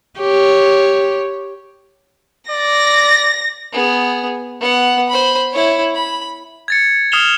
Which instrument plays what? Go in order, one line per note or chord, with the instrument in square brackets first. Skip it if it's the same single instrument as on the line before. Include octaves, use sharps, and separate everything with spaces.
[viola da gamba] G4 C#5
[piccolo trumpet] D5 [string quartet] A#6
[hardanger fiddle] B3 G#4
B3 F#5
C5 B5
E4 C#5
B5
[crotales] G#6 A6 C#7
D#6 F6 C7 E7 F7 G7